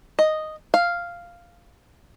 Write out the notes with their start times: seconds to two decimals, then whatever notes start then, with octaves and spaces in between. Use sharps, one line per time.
0.19 D#5
0.74 F5